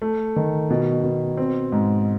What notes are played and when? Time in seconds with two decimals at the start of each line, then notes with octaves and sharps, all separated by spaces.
0.02 A3
0.36 D#3
0.70 B2
1.03 B2
1.37 C4
1.72 G#2